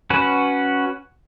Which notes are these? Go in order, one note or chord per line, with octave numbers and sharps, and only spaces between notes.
C#4 F#4 B4